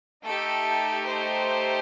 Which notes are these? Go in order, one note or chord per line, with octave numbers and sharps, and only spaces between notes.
A3 D#4 G4 A4
C5